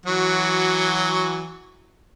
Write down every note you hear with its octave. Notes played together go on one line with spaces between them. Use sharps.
E3 F#3 F#4